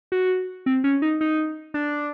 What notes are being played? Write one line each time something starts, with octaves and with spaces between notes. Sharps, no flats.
F#4
C4
C#4
D#4
D#4
D4